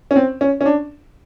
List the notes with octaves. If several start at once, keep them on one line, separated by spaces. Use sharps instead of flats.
C#4
C4
C#4
C#4
D4